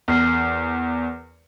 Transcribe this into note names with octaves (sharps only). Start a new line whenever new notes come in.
E2 A#4 F6 C7